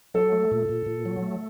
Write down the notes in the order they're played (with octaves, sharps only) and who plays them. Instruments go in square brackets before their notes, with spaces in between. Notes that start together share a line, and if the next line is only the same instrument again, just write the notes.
[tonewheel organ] F#3 [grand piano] A4
[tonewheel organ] A3
A#2
A#2
A#2
F#3
A3